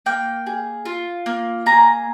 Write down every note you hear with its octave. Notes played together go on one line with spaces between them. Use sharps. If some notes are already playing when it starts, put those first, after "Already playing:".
A#3 G5
G#4
F4
A#3
G#4 A#5